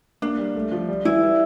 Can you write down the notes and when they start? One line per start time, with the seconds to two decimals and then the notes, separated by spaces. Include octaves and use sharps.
0.22 A#3 D4
0.38 G3
0.55 A3
0.72 F3
0.88 G3
1.05 E3 E4
1.22 G3